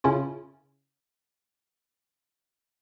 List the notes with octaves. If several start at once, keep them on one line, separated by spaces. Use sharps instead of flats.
C#3 C#4 E4 F4